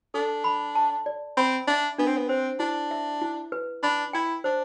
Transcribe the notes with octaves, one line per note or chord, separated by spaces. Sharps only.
D4 A4
B5
A5
D5
C4 B5
D4 E5
B3 D4
C4
B3
C4 C5
D4 E4
E5
E4
B4
D4 B5
E4 G5
D4 C5